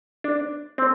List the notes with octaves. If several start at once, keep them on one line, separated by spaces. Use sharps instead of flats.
D4
C4